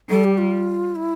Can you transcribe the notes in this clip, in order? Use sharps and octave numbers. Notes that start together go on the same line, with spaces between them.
G3 A4
G4
F4
E4